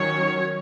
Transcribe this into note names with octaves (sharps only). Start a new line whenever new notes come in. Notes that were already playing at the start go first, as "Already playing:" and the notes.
Already playing: D#3 F#3 C#4 C#5